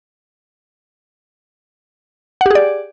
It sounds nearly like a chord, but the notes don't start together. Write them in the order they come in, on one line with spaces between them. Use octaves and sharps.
F#5 G4 G#4 D5